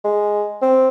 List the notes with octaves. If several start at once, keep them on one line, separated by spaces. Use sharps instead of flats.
G#3
C4